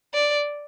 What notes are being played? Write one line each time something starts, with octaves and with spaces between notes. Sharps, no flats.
D5